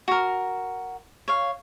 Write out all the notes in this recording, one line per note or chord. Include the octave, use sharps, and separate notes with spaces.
F#4 A#4
C#5 F5